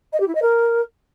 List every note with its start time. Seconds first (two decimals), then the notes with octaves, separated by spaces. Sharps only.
0.13 D#5
0.20 G4
0.27 E4
0.35 D#5
0.42 A#4